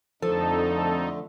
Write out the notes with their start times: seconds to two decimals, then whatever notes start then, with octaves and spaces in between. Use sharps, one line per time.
0.22 F2 D3 F3 A3 D#4 A4